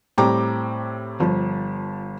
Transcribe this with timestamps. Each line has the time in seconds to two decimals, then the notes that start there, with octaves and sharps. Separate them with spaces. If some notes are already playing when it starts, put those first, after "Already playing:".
0.18 A2 G3 C4 G5 A#5 D6
1.20 G1 F3